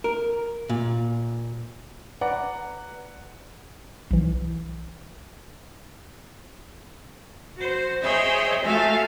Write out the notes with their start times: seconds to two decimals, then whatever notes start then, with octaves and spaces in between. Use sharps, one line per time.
0.04 A#4
0.69 A#2
2.21 B4 D5 F#5 A#5
4.11 B1 E3
7.56 F#4 C5
8.01 G#4 C5 C#5 D#5 E5 G5
8.64 A3 F4 F#4 E5 F5 G#5